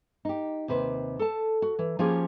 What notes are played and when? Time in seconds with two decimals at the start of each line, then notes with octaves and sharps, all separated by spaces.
0.25 D#4 G4
0.68 D#2 C3 B4 C5
1.19 A4 A5
1.62 F#4
1.79 E3
1.99 F3 A#3 C#4 F4 G4 G#4